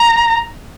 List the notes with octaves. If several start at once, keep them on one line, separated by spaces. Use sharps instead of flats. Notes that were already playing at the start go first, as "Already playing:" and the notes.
Already playing: A#5